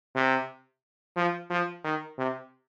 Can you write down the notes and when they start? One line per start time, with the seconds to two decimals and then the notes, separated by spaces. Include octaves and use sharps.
0.15 C3
1.16 F3
1.50 F3
1.84 D#3
2.18 C3